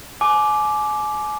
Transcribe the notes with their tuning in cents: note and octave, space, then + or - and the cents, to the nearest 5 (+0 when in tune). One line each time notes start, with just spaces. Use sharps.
G#5 +35 D6 +0